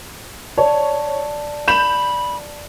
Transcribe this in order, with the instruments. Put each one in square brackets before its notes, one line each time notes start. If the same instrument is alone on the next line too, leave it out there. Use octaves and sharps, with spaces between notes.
[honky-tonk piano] C#5 [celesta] D5 A5
[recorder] B5 [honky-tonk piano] G6 E7